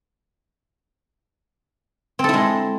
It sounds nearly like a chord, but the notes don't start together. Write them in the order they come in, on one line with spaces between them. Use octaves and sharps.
C4 A4 E4 G#3